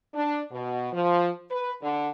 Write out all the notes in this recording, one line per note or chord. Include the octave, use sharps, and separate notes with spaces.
D4
B2
F3
B4
D3